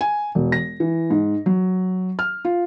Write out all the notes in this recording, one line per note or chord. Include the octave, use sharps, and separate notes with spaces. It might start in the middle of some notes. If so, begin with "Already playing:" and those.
G#5
E1
A#6
E3
G#2
F#3
F6
F4